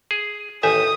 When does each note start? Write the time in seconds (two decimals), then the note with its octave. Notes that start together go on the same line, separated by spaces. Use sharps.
0.11 G#4
0.63 A1 D#2 A4 E5 G#5 D#6